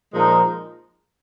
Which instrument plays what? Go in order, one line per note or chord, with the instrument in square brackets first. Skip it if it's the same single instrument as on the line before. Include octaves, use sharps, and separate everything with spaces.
[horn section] A#2 F3 G#3 D#4 A#4